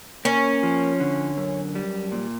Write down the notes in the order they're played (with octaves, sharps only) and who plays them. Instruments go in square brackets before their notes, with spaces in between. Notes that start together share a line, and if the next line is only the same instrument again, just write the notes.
[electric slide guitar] A#3 [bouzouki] C#4
[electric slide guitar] F3
D3
F#2
G3
A#2